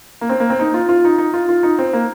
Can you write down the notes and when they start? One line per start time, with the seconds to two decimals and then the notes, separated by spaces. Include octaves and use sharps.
0.21 A#3
0.29 C4
0.40 A#3
0.50 C4
0.59 D#4
0.74 F4
0.89 F4
1.05 D#4
1.18 D#4
1.34 F4
1.49 F4
1.63 D#4
1.79 C4
1.93 A#3